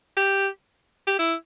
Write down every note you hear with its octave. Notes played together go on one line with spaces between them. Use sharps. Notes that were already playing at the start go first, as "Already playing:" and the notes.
G4
G4
E4